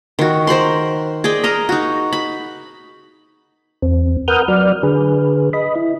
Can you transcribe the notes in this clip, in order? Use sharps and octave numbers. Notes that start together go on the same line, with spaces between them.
D#3 F#4
A#4 C5 B5 C6
G#4 D5 D#5 G5
A#4 D#5 A#5
D#4 F#4
B5
E2 C4
A#4 B4 F#5 D#6 F6 G6
F#3 D5 F6
D3 G#4 B4
D#5 B5
E4